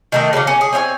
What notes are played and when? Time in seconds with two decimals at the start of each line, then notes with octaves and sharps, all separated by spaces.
0.12 D#3 A3 A#3
0.33 C#3 F#3 G3 A#3
0.47 C#4
0.61 G#4
0.73 C4 C#5 E5 G#5